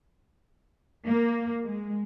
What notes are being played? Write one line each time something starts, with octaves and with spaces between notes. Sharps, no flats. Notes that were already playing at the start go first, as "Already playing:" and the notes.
A#3
G#3